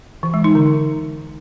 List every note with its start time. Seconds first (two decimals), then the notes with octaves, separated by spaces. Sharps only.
0.23 E3
0.34 G#3
0.44 D#4
0.55 D3